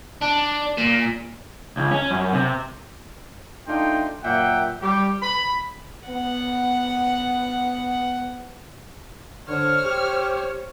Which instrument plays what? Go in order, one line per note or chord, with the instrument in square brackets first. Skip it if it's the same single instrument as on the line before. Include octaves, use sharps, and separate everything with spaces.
[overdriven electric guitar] D4
A#2
[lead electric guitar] C#2
C#4
F#2
C3
[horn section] A3 D4 D#4 F4 G5 C6
F#2 A#2 A#3 E5 F#5 G5
G3 G4
B5
[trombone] B3 [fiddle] F#5
[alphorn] D3 [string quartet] C5 C#5 [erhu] F6
[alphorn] G4